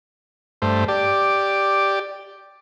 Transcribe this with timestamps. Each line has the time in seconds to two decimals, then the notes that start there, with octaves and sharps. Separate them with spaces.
0.62 G2 A3 C5
0.88 G4 D5